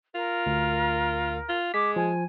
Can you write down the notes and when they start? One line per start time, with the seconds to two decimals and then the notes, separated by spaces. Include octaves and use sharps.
0.15 F4 A#4
0.46 D2
1.49 F4
1.74 G#3 D6 B6
1.96 F3 G#5